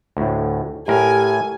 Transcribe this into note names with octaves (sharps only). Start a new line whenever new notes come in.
D2 A2
A2 G4 A#4 G#5